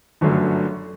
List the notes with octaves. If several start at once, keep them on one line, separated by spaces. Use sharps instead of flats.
G1 F#2 D3 F#3 A3